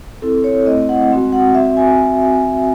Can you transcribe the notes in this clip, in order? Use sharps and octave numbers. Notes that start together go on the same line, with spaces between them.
C4 E4 A4
C#5
A3 C4 E4 D#5
F#5
G#3 C4 F#4
F#5
C4 F#4 E5
G#5